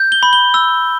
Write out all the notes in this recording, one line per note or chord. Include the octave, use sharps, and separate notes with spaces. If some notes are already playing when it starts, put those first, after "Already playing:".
Already playing: G6
G7
B5
G7
E6